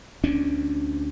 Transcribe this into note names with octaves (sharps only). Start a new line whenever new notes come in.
D2 C#4 D4